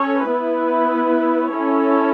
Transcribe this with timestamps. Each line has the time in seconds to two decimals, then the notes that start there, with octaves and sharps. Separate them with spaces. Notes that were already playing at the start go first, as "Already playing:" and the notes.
Already playing: C#4 A4 C#5
0.28 B3 E4 B4
1.52 C#4 E4 A4 C#5